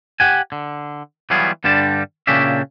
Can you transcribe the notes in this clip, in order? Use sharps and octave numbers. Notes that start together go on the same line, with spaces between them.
G4 F#5 G#5
D3
E3 F#3 G3 B3 F4 G#4
G2 D3 G3 D4 A5
A#2 C#3 C#4 D4 G4 E5